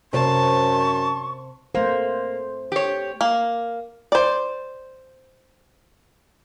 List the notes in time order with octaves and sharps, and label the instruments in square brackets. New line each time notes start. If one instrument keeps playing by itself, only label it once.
[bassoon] F#2 [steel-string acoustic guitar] C3 C5 [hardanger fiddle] A5 [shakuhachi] C#6
[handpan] A3 C5 [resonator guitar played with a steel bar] A#3
[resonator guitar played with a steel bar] G4 C#5
[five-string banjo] A#3
C5 D5